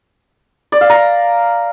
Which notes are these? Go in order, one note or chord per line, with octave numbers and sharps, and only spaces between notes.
D5
F5
A#5